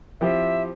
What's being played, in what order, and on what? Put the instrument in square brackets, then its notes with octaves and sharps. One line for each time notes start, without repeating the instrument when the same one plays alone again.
[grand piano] F3 C4 E4 G4 [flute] E5